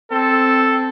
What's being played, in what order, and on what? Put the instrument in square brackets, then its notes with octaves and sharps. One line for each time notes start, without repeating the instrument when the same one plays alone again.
[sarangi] C4 [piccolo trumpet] A4